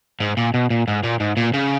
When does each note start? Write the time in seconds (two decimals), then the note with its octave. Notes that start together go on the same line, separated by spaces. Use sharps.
0.20 G#2
0.37 A#2
0.54 B2
0.70 A#2
0.88 G#2
1.04 A#2
1.20 G#2
1.37 A#2
1.54 C#3